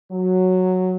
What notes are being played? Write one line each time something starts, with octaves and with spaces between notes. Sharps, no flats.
F#3